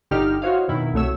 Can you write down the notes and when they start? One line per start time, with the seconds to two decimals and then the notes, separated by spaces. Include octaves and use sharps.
0.11 G1 D3 D#4 G4 G5 F6
0.42 E4 F#4 C5 C#5 D#5 F5
0.68 F2 B2 D#3 E4
0.93 C2 F#3 A3 C#5 E6